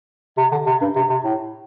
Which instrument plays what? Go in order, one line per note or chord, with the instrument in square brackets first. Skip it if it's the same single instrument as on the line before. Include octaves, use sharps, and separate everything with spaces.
[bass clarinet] C3
D3
C3
G2
C3
C3
A2